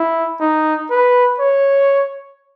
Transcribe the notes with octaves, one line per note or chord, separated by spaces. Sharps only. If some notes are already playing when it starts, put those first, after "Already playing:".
Already playing: E4
D#4
B4
C#5